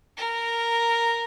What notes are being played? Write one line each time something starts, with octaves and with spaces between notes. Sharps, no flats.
A#4